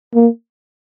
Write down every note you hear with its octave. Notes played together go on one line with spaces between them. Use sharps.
A#3